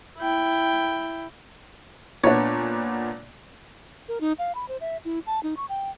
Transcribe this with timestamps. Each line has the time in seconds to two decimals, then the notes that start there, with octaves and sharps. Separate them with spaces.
0.18 E4 G5
2.24 A#2 B3 D4 C#5
4.08 A#4
4.21 D#4
4.39 F5
4.55 B5
4.68 C5
4.81 E5
5.05 E4
5.27 A5
5.43 D#4
5.57 C#6
5.69 G5